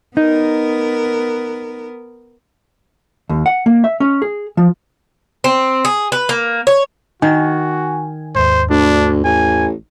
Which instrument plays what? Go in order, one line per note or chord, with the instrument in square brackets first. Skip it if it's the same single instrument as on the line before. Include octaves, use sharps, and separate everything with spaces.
[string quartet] B3 A#4 [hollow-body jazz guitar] D#4
[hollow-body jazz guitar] D#2
F#5
A#3
E5
C#4
G#4
F3
[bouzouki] C4
G#4
B4
A#3
C#5
[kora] D#3 [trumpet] F#4 [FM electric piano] G#5
[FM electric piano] D#2 G#2 [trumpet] C5
[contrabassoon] D2 [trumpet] D4
[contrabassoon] A1 [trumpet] G#5